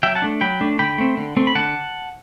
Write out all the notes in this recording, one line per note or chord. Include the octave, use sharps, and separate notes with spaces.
F#3 E5 G5
F#5 A5
A3 D4
F#3 G5 B5
A3 D4
D3 G5 B5
A3 C4
D3
A3 C4
B5
D3 F#5 A5